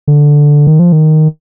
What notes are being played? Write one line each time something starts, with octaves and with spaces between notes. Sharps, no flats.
D3
D#3
F3
D#3